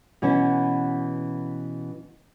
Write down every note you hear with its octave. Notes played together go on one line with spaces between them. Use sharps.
B2 E3 C#4